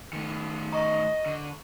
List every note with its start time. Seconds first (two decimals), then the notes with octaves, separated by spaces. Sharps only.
0.13 D#3 A3
0.72 D#5 A#5 C#6
1.26 D3